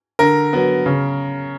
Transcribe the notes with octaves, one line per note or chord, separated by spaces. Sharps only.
D3 A#4
F#3 B3
C#3